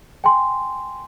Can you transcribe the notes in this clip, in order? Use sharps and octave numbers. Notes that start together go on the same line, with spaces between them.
G5 G#5 C6